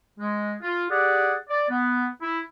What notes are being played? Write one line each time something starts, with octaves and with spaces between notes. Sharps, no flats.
G#3
F4
G4 G#4 D5 F#5
D5
B3
E4